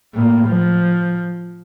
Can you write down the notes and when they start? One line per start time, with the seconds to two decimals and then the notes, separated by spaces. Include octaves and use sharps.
0.14 A2 A#3
0.48 F3